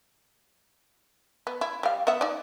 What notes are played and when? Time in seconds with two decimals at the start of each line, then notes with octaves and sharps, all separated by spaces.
1.47 B3
1.61 E4
1.83 G3 F5
2.07 B3 E5 F#5
2.21 D#4 D5